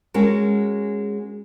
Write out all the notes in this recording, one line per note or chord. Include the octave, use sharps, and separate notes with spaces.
G#3 C#4 F#4 A#4